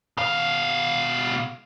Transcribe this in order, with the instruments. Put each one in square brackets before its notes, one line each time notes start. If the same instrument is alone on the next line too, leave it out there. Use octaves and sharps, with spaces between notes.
[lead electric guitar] B2 F5